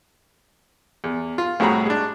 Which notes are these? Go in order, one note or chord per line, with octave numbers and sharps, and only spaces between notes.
E2
F4
C2 A2 F#4 G#4 A#5 B5
G#3 D4